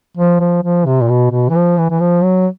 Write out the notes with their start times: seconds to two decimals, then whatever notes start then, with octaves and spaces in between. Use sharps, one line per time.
0.17 F3
0.40 F3
0.63 F3
0.85 C3
1.01 A#2
1.08 B2
1.31 B2
1.49 E3
1.55 F3
1.78 E3
1.90 E3
2.00 F3
2.23 F#3